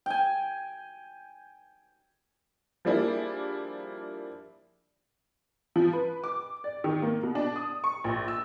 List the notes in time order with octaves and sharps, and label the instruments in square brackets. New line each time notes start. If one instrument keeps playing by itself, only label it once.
[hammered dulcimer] G5 G#5
[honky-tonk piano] F3 G3 A#3 D4 E4 G#4
F3
B4
D6
D5
D#3
A#3
B2
D4
D#6
C#6
A#1
E6